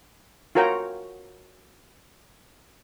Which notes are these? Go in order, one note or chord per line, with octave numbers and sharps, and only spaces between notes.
F4 F#4 A#4 C#5 G5 A#5